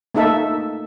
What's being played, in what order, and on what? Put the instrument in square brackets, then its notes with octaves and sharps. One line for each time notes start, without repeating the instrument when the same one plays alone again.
[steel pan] A3 A#3 D#4 A4 E5